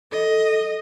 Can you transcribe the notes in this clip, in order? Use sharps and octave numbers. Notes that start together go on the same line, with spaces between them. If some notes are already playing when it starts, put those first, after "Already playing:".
A4 D#5